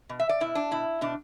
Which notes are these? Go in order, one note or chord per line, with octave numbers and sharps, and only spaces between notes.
B2
E5
D5
B2 E4
D4
B2 E4
B2 D4